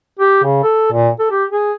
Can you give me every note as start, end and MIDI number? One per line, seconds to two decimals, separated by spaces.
0.20 0.40 67
0.44 0.60 49
0.63 0.90 69
0.93 1.09 46
1.19 1.27 69
1.31 1.45 67
1.50 1.73 68